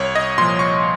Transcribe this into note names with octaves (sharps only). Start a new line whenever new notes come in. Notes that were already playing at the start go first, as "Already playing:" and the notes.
Already playing: C2 C#5
D#5
A#2 F3 C6
C#6